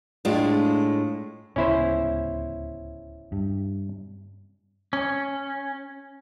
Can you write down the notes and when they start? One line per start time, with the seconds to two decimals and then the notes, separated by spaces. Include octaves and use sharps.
0.25 A2 G#3 D4 F4
1.56 D1 C#2 B3 C#4 E4 C5
3.32 G2
4.93 C#4